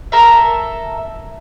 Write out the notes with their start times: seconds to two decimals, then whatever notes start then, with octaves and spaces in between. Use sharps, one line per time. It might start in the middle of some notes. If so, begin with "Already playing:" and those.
0.12 A4 A#4 E5